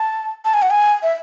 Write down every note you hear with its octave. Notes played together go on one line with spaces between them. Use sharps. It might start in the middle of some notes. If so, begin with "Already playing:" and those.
Already playing: A5
A5
G#5
F#5
G#5
E5